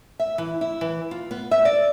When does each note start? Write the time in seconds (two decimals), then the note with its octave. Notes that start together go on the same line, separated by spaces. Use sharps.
0.19 E5
0.38 E3
0.61 E4
0.81 E3
1.11 F4
1.31 B3
1.51 E5
1.65 D5